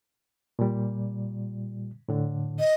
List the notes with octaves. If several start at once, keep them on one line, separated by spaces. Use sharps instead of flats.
A#2 G3
A2 D3
D#5